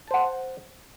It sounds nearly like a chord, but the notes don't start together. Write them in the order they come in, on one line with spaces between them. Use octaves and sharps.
A5 C5 F#5